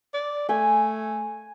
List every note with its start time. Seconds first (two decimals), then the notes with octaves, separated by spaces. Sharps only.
0.14 D5
0.49 A3 G#5